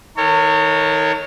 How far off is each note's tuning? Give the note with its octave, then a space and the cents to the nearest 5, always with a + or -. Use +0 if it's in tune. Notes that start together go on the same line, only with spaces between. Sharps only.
D#3 +30 A#4 -45 C#5 +0